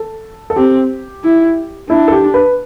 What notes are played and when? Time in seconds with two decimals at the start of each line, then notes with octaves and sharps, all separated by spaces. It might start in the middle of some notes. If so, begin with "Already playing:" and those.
Already playing: A4
0.50 A4
0.56 C4 G4
1.24 E4
1.89 D4 E4
2.08 A4
2.12 G4
2.34 B4